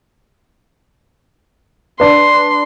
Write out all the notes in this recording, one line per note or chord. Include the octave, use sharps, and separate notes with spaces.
D4 B4 C6